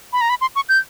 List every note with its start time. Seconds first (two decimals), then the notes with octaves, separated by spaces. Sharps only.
0.13 B5
0.21 A#5
0.30 B5
0.41 C6
0.56 C#6
0.69 G6